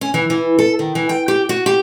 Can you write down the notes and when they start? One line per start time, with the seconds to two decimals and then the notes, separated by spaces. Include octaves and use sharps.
0.01 C#4
0.14 E3
0.30 E3
0.59 A4
0.79 D#3
0.95 E3
1.09 G5
1.28 G4
1.49 F#4
1.66 G4